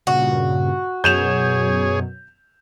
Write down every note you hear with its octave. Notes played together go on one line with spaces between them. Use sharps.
G2 A#2 C#3 F#4
F#2 B2 F#3 G#4 C#5 G6 E7 F7